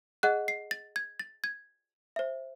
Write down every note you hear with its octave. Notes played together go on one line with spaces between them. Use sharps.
G#4 D#5 F#5 F#6
C7
A6
G#6
A6
G#6
C5 E5